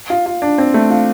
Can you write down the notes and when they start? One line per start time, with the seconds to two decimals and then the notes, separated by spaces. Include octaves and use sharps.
0.10 F4
0.26 F4
0.42 D4
0.58 C4
0.74 A3
0.90 F4